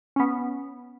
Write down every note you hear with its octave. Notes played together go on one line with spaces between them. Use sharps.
B3 C#4